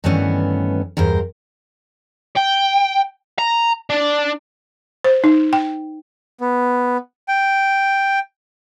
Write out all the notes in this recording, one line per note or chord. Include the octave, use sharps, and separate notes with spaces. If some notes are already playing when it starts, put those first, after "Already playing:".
G2 D#3 E3 A3 B3 C#4
E2 G2 A#4 C5
G5
A#5
D4
C5
D#4
G5
B3
G5